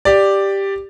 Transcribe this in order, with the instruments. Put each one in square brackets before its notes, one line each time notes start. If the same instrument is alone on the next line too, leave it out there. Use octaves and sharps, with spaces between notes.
[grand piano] G4 D5